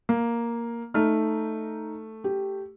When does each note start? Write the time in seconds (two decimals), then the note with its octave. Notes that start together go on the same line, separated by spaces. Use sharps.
0.09 A#3
0.94 A3 D#4 F6
2.24 G4